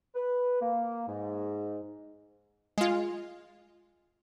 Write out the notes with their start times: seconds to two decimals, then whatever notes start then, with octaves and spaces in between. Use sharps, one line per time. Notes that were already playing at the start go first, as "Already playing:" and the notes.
0.15 B4
0.62 A#3
1.08 G#2
2.78 G#3 F4